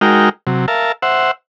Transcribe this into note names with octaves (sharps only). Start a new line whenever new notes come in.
G#3 D#4 F#4 A#4 G5 F6
C3 F#3
A#4 E5 F5 A5
C5 E5 F#5